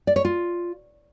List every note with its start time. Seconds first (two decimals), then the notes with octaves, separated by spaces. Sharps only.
0.07 D5
0.16 C#5
0.25 F4